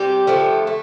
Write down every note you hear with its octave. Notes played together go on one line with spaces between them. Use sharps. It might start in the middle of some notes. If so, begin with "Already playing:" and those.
Already playing: C3 G3 G4
D3 F3 A3
A3